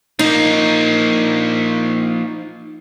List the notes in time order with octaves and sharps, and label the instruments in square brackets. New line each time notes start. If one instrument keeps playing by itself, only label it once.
[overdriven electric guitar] F3 A#3 [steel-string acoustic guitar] D#4